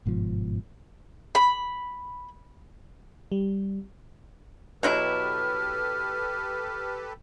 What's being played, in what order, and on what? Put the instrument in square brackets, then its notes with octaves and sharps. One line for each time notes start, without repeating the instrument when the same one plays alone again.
[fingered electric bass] G1 G#2 B2 F3
[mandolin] B5
[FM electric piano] G3
[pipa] B2 F#3 E4 [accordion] G4 A4 B4 [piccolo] F6